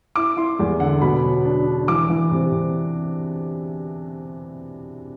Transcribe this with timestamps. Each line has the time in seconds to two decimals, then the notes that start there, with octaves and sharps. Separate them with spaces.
0.16 E4 D6
0.37 E4 C6
0.59 E2
0.80 D3 F#5
1.02 B2 B5
1.23 F#3
1.45 D4
1.66 D4
1.88 E3 D6
2.10 E3
2.31 C3
2.52 C3